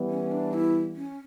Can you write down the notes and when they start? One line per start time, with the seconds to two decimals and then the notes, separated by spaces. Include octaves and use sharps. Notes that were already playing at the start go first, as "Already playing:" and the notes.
Already playing: E3 G3 B3
0.10 C#4
0.32 D4
0.53 E4
0.96 C#4